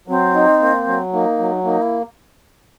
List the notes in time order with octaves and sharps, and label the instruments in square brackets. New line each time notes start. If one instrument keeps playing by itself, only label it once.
[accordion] F#3 [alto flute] C4
[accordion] D#4
A#3
F#3
[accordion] A#3 [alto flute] D#4
[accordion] F#3
[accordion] A#3 [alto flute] D#4
[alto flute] E4